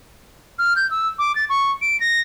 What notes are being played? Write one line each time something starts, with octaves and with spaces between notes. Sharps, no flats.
F6
G6
E6
D6
A6
C#6
D7
A#6